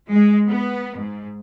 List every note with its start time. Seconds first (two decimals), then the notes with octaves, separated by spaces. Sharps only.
0.10 G#3
0.47 B3
0.97 G#2